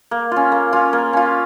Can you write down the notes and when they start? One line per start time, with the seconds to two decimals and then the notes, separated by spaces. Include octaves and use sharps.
0.11 A#3
0.32 C#4 F4
0.52 A#3
0.73 C#4 F4
0.93 A#3
1.13 C#4 F4